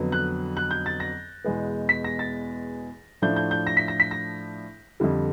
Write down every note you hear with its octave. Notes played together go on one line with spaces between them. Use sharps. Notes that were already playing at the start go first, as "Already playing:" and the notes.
Already playing: F2 D3 F#3 B3
F#6
F#6
G6
A6
A#6
E2 B2 G#3 B3
B6
A#6
A6
A2 F3 A3 D4 G6
G6
G6
A#6
B6
A#6
B6
A#6
F2 D3 G3